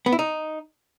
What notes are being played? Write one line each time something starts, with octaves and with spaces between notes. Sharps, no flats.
B3
E4
D#4